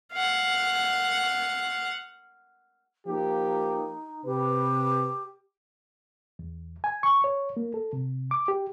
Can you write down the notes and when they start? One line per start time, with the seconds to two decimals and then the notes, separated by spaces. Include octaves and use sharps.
0.13 F5 F#5
3.07 F3 A#3 D#4 G4
4.26 C3 G4 B4
6.39 E2
6.84 G#5
7.03 C#6
7.24 C#5
7.57 A#3
7.74 A4
7.93 C3
8.31 D6
8.48 G4